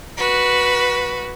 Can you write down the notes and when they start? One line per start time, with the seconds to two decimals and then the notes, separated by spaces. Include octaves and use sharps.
0.18 F#4 B4